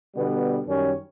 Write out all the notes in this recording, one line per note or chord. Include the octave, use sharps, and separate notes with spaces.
B2 D3 G3 B3
F#2 D#3 G3 C#4